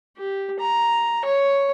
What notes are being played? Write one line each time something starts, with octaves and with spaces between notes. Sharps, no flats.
G4
A#5
C#5